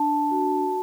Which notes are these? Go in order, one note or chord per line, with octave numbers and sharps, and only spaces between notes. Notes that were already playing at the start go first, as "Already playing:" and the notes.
Already playing: D4 A5
F#4